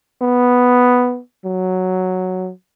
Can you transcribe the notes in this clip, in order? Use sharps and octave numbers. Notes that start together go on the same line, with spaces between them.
B3
F#3